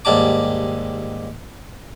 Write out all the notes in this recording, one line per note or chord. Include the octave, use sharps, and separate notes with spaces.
D#2 G#2 G3 A5 D6